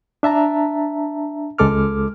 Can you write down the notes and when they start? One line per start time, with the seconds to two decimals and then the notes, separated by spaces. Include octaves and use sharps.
0.23 D4 E5 A5 A#5
1.59 C#2 G#3 A4 D6 F6